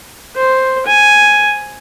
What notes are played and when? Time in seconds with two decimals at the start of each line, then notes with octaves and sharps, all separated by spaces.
0.37 C5
0.86 G#5